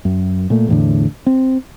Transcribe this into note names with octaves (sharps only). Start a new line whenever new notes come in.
F#2
A#2 A3
E2 A2 D3
C4